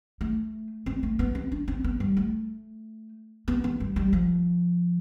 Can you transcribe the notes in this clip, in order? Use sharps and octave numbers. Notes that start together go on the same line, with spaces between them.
A3
C4
A3
B3
C4
D4
C4
B3
G3
A3
B3
B3
G3
G3
F3